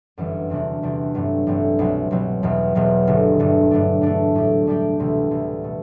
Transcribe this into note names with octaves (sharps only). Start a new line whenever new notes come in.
G1 F#2 E3 G3
E2 C3 G3 D4 F#4
E2 C3 G3 D4 F#4
A1 G2 F#3 A3 C4
A1 G2 F#3 A3 C4
C2 B2 F#3 C4
C2 B2 F#3 C4
E1 E2 B2 F#3
E1 E2 B2 F#3
G1 G2 D3 A3
G1 G2 D3 A3
G2 F#3 A3 D4
G2 F#3 A3 D4
A2 G3 D4 G4
A2 G3 D4 G4
D2 C3 E3
D2 C3 E3
B2 A3